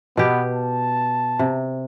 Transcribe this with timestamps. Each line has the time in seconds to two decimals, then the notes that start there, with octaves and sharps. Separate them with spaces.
0.17 B2 B3 G4
0.53 A5
1.39 C3